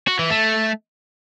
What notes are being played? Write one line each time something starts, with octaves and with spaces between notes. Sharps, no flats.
F#4
E3
A3